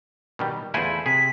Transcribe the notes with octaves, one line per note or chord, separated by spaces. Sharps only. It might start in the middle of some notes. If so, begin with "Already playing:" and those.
B2 D#3 G3
E2 A3 E4 F4 C5 G#5
C3 G#4 B6